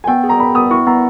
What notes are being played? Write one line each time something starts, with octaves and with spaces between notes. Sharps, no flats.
G#5
B3 G5
G#4
A#5
B3 B5
B3 D#6
E4 C#6
B3 A#5